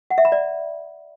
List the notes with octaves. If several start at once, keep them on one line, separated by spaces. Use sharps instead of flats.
F#5
E5
B5
D5